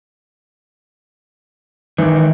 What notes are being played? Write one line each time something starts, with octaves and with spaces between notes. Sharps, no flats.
G#1 D#3 E3